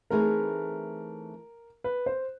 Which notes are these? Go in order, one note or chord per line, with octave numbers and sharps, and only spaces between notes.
E3 A3 C4 D#4 G#4 A#4
B4
C5